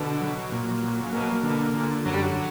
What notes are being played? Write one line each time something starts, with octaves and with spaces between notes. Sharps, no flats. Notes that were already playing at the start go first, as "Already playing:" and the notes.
Already playing: B2 D3
F#3
A#2
F#3
C#3
B2 A#3
B2 D3
A#2 D3
F#2 F#3
G3
F#3